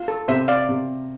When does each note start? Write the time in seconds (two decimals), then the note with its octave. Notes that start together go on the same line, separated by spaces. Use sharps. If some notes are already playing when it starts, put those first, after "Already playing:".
Already playing: F4
0.08 A4
0.28 C3 C5 E5
0.48 D5 F5
0.69 C3